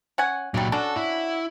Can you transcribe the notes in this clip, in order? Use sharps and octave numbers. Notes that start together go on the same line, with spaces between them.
C#4 F#5 G#5
A#2 F#3 G3 A3 A#3
C#4 D4 F#4 A4
E4